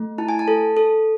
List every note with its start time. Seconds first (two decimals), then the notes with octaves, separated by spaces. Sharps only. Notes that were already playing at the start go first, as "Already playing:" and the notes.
Already playing: A3
0.18 E4 A5
0.29 G#5
0.39 A5
0.48 A4
0.77 A4